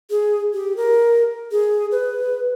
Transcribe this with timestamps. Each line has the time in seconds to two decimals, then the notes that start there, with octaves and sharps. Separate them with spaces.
0.10 G#4
0.54 G4
0.77 A#4
1.52 G#4
1.91 B4